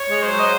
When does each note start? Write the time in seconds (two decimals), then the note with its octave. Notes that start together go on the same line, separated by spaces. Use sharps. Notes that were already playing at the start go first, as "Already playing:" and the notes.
Already playing: C#5
0.08 G#3
0.23 F#3 C5
0.38 D#5